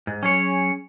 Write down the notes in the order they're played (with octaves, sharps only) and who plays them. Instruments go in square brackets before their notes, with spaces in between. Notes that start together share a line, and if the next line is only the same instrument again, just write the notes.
[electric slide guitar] G#2
[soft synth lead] F#3 [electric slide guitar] C#4 G#4 C#5